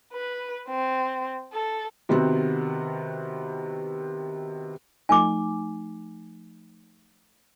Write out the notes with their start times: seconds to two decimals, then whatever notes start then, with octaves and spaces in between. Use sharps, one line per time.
0.13 B4
0.69 C4
1.53 A4
2.09 C3 D#3 B3 C4 F#4
5.09 F3 A3 D#4 G#5 D6